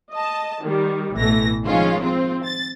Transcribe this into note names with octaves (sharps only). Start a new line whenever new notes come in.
D#5 A5
D#3 G3
A1 B2 E3 A3 A#6
D#3 F3 G#3 C#4 F4
C4 F4
A6